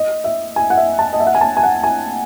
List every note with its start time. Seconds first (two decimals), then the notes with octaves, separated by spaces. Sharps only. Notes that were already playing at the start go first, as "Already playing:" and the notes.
Already playing: D#5
0.24 E5
0.56 G#5
0.70 F#5
0.77 E5
0.99 A5
1.13 D#5
1.20 E5
1.27 F#5
1.35 G#5
1.41 A5
1.57 G#5
1.63 F#5
1.84 G#5